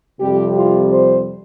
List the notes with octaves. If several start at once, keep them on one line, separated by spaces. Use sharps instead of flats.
F2 C3 G3 G4
F4
C5